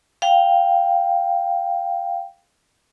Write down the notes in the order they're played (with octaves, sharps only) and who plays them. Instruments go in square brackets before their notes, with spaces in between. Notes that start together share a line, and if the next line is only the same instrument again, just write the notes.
[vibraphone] F5 G5